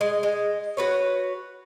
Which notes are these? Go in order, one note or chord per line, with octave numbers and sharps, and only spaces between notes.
G#3
G#3
F#4 B4 C#5